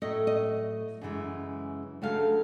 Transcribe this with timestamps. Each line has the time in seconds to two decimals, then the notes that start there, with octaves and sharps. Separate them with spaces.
0.02 A2 F#3 A3 D#5
0.27 D#5
1.01 F#2 C#3 E3 G#3
2.02 D2 C#3 F#3 A3 F5